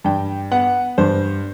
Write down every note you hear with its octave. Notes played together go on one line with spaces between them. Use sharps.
G2 G5
B3 F#5
G2 C5